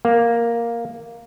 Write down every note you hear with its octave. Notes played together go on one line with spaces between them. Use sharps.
A#3